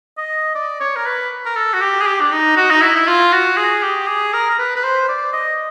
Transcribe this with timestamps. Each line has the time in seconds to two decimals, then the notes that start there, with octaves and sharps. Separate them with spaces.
0.18 D#5
0.55 D5
0.80 C#5
0.96 A#4
1.06 B4
1.46 A#4
1.56 A4
1.73 F#4
1.81 G4
2.01 G#4
2.07 G4
2.21 D4
2.32 D#4
2.56 F#4
2.71 D#4
2.81 E4
2.96 E4
3.07 F4
3.33 F#4
3.57 G#4
3.83 G4
4.07 G#4
4.33 A#4
4.51 A#4
4.58 B4
4.76 B4
4.84 C5
5.09 D5
5.33 D#5